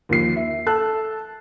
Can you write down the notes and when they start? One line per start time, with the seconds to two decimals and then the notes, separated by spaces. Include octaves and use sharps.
0.09 D#2 F3 C7
0.36 E5
0.66 A4 A5 F#6